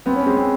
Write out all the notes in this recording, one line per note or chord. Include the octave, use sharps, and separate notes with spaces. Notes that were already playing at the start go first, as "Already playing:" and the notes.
B3 C4
C#4
G#3 C4
C4